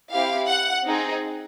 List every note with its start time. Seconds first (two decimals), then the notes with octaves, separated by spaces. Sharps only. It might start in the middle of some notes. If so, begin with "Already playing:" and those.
0.11 C4 E4 G4 F5
0.49 F#5
0.85 C4 D#4 G#4